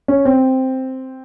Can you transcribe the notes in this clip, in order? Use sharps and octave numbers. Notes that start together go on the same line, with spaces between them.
C#4
C4